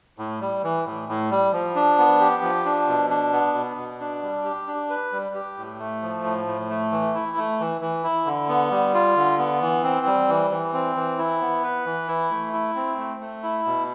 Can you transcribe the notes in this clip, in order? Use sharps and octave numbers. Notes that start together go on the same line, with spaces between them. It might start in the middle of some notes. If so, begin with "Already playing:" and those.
A2
G3
E3
A2
A2
G3
F3
D4
B3
G4
F3
D4
B2
D4
B3
B2
B2
D4
G3
G4
D4
B4
G3
G4
A2
A3
F3
A2
A2
A3
E3
E4
A3
E3
E3
E4
D3
B3
G3
F4
D3
B3
E3
C4
G3
E3
E3
C4
E3
E4
B3
B4
E3
E4
A3
E4
C4
A3
A3
E4
B2